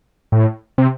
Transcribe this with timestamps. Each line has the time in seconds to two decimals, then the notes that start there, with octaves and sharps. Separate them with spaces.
0.32 A2
0.78 C3